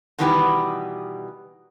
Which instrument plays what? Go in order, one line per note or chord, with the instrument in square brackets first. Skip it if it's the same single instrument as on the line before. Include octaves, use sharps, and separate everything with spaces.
[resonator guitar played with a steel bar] B2 D#3 E3 G3 B3 G4